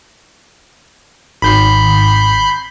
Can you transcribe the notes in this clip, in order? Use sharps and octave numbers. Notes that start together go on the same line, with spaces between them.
G#1 B5 G6 C7